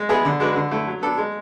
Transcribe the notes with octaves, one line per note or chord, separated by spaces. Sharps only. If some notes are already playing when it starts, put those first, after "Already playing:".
Already playing: G#3
B3 E4 G#4 B4
D3
G#3 D4 F#4 B4
D3
A3 E4
F#3
B3 D4 A4
G#3